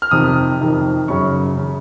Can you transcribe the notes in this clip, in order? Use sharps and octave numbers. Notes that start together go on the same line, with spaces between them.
F6
F2 C3 D#3 D#6
F2 C3 D#3
F#2 C#3 C#6
C#3